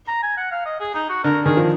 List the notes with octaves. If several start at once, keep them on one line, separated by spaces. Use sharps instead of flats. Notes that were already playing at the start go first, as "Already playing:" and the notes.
A#5
G#5
F#5
F5
D#5
G#4
D#4
F#4
D3 A#4
D#3 G#4
F3